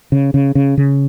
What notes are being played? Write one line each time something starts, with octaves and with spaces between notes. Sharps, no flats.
C#3
C#3
C#3
C#3